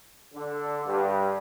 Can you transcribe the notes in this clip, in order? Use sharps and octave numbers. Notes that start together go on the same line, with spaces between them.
D3
G2